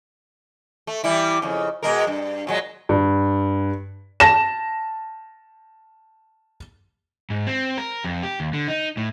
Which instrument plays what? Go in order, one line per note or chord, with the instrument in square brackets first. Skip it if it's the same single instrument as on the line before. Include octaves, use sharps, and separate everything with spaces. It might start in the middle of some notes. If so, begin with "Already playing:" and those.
[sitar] A3
E3 G3 E4
F2 C#3
B2 G#3 A#4
G2
A#2 F#3 G#3
[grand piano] G2
[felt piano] A5 A#6 E7
[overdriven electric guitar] G#2
C4
A#4
F2
G4
D#2
D3
D#4
A2